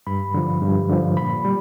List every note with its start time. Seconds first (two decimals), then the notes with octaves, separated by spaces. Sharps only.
0.07 G2 B5
0.34 D3 F3
0.62 G2
0.89 D3 F3
1.17 A#2 B5
1.45 G3